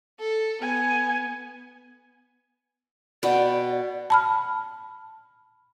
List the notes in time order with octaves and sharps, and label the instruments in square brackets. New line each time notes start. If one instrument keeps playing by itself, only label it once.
[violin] A4
[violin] B3 [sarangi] G#5
[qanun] B2 G5 [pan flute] D5
[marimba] A5 B5 F6